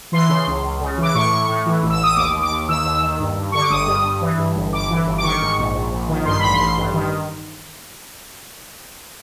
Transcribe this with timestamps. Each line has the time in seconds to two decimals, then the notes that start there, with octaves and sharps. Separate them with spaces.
0.12 E3 C6
0.29 C#3
0.47 C#2
0.64 C#2
0.81 C#3
0.98 E3 D6
1.14 A2 C#6
1.32 A2
1.49 A2
1.66 E3
1.82 A1
1.90 E6
2.00 A1 D#6
2.16 D#2 D6
2.34 D#2
2.42 D6
2.51 D#2
2.69 D#3 E6
2.85 D#2
3.02 D#3
3.19 G2
3.37 G2
3.52 D3 C#6
3.62 D6
3.70 G1 D#6
3.87 G2
4.04 G2
4.21 E3
4.38 G2
4.55 G1
4.72 G1 D6
4.90 E3
5.06 G1
5.18 D6
5.23 D#3 C#6
5.41 G#2
5.58 A#1
5.75 A#1
5.92 A#1
6.09 D#3
6.26 G2 C6
6.39 A1 B5
6.53 C6
6.60 A1
6.78 G2
6.94 D#3